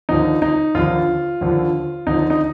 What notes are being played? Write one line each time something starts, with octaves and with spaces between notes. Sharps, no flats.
D#2 D3 F3 D#4
D#4
D#2 D3 F3 F4
D#2 D3 F3
D#2 D3 F3 D#4
D#4